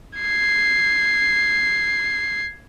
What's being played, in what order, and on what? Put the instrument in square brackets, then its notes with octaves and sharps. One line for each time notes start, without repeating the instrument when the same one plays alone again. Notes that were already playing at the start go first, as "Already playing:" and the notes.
[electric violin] G#6 C7